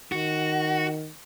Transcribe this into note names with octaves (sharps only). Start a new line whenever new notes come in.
D#3 F#4